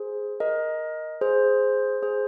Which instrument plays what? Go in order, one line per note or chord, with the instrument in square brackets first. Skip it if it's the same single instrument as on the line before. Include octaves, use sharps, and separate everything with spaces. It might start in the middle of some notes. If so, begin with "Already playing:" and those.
Already playing: [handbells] G#4 C5
A#4 D#5
G#4 C5
G#4 C5